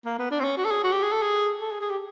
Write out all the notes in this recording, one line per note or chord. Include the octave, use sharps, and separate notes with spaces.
A#3
B3
D4
C4
C#4
F#4
A4
G#4
F#4
G4
G#4
A4
G#4
A4
G#4
G#4
G4